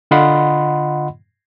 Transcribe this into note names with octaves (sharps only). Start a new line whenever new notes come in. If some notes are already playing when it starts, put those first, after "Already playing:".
D3 F4 D#5 F#5 B5 C6